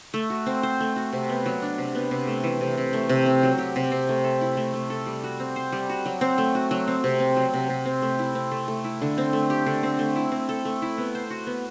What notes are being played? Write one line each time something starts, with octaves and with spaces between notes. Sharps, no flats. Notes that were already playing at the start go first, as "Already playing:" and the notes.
A3
F#4
C4
C5
A3
F#4
C3
B3
F#3
D4
C3
B3
C3
A3
E3
C3
C3
A3
C3
C4
F#3
G4
C3
C4
A3
A4
E4
A3
A3
A4
G3
F#4
C4
C5
G3
F#4
F#3
C4
A3
F#4
F#3
C4
C3
C4
F#3
C3
C3
C4
A3
E4
C4
A3
A3
E4
D3
C4
A3
G4
D3
C4
A3
E4
C4
A4
A3
E4
B3
C5
F#4
B3